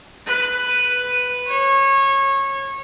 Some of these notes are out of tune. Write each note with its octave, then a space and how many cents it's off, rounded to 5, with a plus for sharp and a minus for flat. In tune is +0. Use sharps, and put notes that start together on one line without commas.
B4 +5
C#5 -25